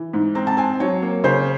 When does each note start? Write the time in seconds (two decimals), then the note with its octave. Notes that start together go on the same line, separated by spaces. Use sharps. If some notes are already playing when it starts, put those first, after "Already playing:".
Already playing: E3
0.14 G#2
0.35 C4 A#5
0.47 A5
0.57 C4 G#5
0.80 F#3 C#5
1.02 A#3
1.24 C#3 C5